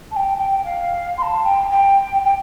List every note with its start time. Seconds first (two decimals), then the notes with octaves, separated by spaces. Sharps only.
0.11 A5
0.16 G5
0.38 G5
0.64 F5
1.17 C6
1.22 A5
1.44 G5
1.70 G5
2.25 G5